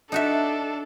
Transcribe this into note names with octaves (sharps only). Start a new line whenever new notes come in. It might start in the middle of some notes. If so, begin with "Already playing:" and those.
D4 D#4 F#4 A4 E5